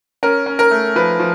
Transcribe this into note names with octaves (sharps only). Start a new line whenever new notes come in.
C#4 A#4
C#4
A#4
A3
F3 B4
F3